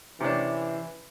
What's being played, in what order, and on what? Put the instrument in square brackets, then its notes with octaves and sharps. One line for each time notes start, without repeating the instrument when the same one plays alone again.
[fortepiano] C3 C#4 D4 [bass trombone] E3